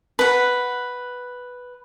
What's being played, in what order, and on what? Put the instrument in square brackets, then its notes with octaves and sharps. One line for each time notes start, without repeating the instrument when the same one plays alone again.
[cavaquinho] B4 F#5